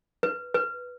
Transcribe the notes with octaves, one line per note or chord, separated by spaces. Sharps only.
B4
B4